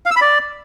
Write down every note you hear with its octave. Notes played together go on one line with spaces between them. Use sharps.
F5
E6
B5
D5